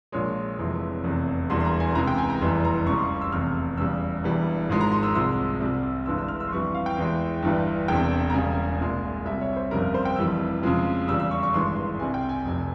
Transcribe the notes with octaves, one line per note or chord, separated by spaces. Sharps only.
A#1 A#2 G#3 C#5
F1 F2 C3 E3 G#3
F1 E2 C3
E1 E2 E3 G3 C6
C6
A#5
G#5
C#2 C3 E3 G#3 A#5
G5
G#5
A#5
F1 E2 E3 G3 C6
A#5
C#2 C#3 G3 C#6
C6
E6
F1 E2 C3 F6
E2 C#3 G3 E6
E1 E2 E3 G3
G#1 G#2 F3 G#3
A#5
C6
E6
C2 C3 F3 G#3 E6
C2 C3 G3
G1 G2 E3 G#3 E6
E6
F6
E6
C6
F2 E3 G3 C#6
F5
G5
E2 E3 G#3
G1 G2 E3 G3
E1 E2 C3 G5
A#5
E1 E2 C#3 G3 G#5
C2 A#2 G#3
C2 C3 G3 E5
C#5
C5
G1 F2 C#3 G3 A#4
A#4
C5
G5
F1 F2 E3 G3 E6
F2 C#3 F3 G#3
E2 C#3 G3 E6
E6
C#6
C#6
G#1 G2 E3 G#3 C6
C6
C2 C3 G3 G#5
G5
G#5
F1 F2 C3